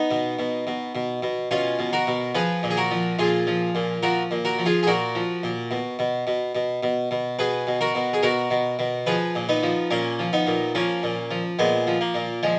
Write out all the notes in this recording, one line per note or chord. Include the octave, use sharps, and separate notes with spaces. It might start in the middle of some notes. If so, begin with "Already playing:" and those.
Already playing: B3 D#4
B2
B2
B2
B2
B2
B2 C#4 F4
B2
F#4 A#4
B2
F3 G#4 B4
A#2
G#4
F#4 A#4
F3
A#2 F4 G#4
F3
A#2
F3 F#4 A#4
A#2
F#4 A#4
F3
F4 G#4
G#4
A#2 F#4 A#4
F3
A#2
B2
B2
B2
B2
B2
B2
B2 G#4 B4
B2
F#4 A#4
B2
G#4
B2 F#4 A#4
B2
B2
F3 G#4 B4
A#2
B3 D#4
F3
A#2 A#3 C#4
F3
B3 D#4
A#2
F3 A#3 C#4
A#2
F3
A#2 G#3 B3
F3
A#3
A#2
F3 G#3